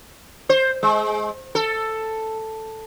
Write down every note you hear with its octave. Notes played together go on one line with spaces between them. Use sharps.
C5
G#3
A4